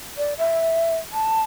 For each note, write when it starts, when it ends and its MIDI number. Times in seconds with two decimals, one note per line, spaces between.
0.17 0.34 74
0.38 0.98 76
1.12 1.42 81